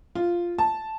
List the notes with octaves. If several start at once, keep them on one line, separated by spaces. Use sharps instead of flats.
F4
A5